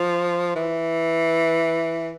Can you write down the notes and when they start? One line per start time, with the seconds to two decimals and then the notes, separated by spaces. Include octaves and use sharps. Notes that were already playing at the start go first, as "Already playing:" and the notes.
Already playing: F3
0.55 E3